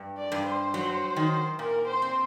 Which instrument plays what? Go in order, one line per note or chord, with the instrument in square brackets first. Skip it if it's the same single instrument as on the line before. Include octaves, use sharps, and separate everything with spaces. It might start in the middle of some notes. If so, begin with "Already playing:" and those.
Already playing: [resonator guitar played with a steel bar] G2
[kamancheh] D5
[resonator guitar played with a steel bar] G2
[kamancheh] C5
[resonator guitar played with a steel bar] F#3
D#3
[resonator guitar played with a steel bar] A#2 [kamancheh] A#4
[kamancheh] C5
[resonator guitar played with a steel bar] C4